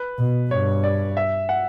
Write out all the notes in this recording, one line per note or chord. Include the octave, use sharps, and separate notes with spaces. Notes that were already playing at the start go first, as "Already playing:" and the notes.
Already playing: B4
B2
G2 C#5
D5
E5
F#5